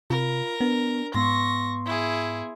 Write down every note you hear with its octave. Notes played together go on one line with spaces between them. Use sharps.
C3 F4 A#4
B3 D4
G#2 B3 C6 C#6 A#6
E4 G#4